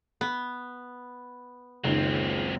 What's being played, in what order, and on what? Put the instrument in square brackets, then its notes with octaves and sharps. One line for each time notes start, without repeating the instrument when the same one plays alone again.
[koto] B3
[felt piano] F#1 D#3 [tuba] C#2 [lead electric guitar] F#3 C4